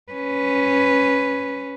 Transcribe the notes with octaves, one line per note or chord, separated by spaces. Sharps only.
C#4 B4